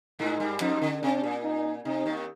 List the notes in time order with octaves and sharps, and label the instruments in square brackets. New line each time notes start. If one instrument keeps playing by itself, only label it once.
[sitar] G#2 G#3 [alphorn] D#4
[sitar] G2 G3
[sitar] F2 F3 [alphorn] D#4
[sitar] D3
[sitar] C3 [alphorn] D4
[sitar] A#2
[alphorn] D#4
[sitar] C3 [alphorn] D#4
[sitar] D#2 D#3